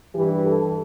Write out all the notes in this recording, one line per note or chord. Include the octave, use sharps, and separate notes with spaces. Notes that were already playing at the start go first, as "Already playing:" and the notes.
G2 E3 G4
A4